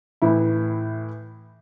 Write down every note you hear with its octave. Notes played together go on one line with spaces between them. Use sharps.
A2 E3 E4